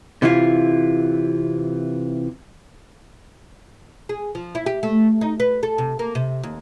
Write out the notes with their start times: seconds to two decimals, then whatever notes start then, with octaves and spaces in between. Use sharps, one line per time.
0.22 C3 E3 E4 F4
4.09 G#4
4.35 F3
4.55 E4
4.66 G4
4.83 A3
5.21 D#4
5.40 B4
5.63 A4
5.78 C3
5.99 A#3
6.15 C3
6.43 D#2